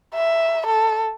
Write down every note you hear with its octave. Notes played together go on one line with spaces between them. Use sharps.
E5
A4